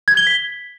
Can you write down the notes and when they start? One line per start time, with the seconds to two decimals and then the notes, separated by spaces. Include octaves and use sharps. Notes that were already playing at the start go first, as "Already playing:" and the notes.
0.08 G#6
0.17 G7
0.27 B6